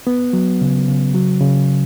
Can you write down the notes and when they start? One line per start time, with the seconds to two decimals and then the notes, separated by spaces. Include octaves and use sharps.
0.07 B3
0.33 F#3
0.61 C#3
0.88 C#3
1.14 F#3
1.40 C#3